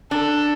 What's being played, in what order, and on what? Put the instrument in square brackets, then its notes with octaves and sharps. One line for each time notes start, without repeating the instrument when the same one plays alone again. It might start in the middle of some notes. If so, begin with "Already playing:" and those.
[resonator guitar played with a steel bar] D4 [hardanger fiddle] A4